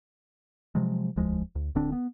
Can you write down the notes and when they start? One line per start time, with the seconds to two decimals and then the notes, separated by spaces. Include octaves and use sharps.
0.75 C3 F3 F#3 G#3
1.16 E1 D2 F3 G#3
1.55 D2
1.75 D1 D3 C4 D4
1.92 B3